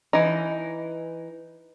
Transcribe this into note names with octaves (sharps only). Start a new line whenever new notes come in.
E3 D#4